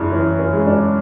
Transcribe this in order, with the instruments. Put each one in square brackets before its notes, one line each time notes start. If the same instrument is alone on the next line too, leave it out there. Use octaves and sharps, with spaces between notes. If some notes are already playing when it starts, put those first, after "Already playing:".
Already playing: [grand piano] F#2 C#3 [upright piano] D4 E4
[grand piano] E3 [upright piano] C#4
[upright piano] C#4
[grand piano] G#3
[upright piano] D4